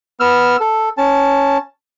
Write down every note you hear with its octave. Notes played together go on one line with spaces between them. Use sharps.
B3 E6 F6
A4
C#4 A5